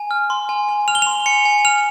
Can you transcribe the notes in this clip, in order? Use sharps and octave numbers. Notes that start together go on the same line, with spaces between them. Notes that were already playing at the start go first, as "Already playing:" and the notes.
Already playing: G#5
F6
C6
G#5
G#5
F6 F7
G7
F7
C6
G#5 C#7
G#5
F6 F7